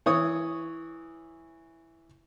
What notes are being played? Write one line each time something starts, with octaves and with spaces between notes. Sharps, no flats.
E3 C#5 D#6